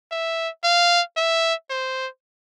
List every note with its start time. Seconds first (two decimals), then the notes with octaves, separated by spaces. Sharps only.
0.12 E5
0.64 F5
1.17 E5
1.70 C5